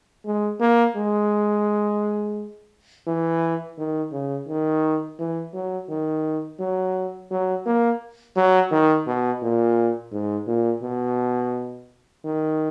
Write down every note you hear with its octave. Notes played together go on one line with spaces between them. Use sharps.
G#3
A#3
G#3
E3
D#3
C#3
D#3
E3
F#3
D#3
F#3
F#3
A#3
F#3
D#3
B2
A#2
G#2
A#2
B2
D#3